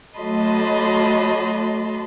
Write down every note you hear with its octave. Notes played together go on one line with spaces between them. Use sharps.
F#3 A3 D#5 A5 B5 C6